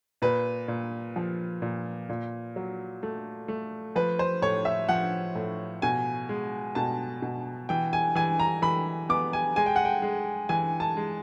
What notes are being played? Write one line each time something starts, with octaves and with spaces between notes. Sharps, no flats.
A#2 B4
A#2
F3
A#2
A#2
F#3
A3
A3
F3 B4
C5
A2 C#5
E5
F3 F#5
A2
B2 G#5
G#3
B2 A5
B2
E3 G5
G#5
E3 G#5
A#5
E3 B5
B3 D6
G#5
G#3 G#5
G5
F#5
G5
G#3
E3 G#5
A5
G#3